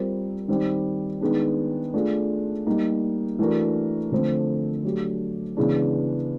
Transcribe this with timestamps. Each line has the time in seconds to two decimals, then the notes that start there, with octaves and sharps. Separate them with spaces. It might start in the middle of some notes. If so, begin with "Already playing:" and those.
Already playing: G3 C4 F4 A#4
0.48 D#3 G3 C4
1.21 D#3 G#3 B3 D4
1.94 A3 D4 F4 G#4
2.67 G3 A#3 D#4
3.39 E3 A3 D4 F#4 A#4
4.12 D3 F3 A3 C4
4.84 F#3 A3 D4 G4
5.57 C#3 E3 G#3 B3 D4